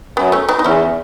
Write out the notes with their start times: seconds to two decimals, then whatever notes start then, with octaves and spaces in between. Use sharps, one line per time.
0.17 F#2 B3
0.32 A3 C#4
0.49 B3 D#4
0.59 D#4
0.64 E2 C#4 E4